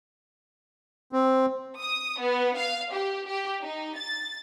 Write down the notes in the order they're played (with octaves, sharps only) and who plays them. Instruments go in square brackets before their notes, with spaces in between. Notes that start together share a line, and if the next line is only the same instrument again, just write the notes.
[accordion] C4
[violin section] D#6
B3
F5
G4
G4
D#4
A6